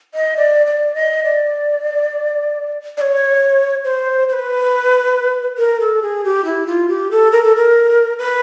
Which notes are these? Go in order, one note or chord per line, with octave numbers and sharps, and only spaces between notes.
D#5
D5
D5
D#5
D5
D5
C#5
C5
C5
B4
A#4
A4
G#4
G4
E4
F4
G4
A4
A#4
A4
A#4
B4